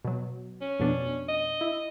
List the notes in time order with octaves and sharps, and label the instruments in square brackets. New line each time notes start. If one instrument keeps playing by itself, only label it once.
[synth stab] B2 F#3
[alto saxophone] C#4
[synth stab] F2 B2 D4
[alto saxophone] D#5
[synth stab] E4